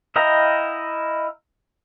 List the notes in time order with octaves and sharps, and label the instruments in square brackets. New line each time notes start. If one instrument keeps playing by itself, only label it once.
[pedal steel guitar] E4 D#5 F5 G5 A#5